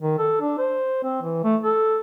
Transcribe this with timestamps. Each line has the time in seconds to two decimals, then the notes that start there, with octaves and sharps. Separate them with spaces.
0.02 D#3
0.19 A4
0.41 D4
0.58 C5
1.04 C4
1.23 E3
1.44 A3
1.64 A4